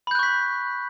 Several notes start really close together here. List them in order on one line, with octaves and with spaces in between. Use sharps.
B5 G6 F#6 C#6 B6